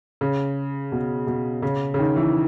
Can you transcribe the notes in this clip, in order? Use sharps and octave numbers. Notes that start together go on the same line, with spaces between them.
C#3
B2
B2
C#3
C#3
D#3
E3